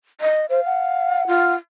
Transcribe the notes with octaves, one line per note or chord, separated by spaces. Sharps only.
D#5
C5 F5
F#5
F4